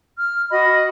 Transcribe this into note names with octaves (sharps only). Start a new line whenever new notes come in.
F6
F#4 D#5 B5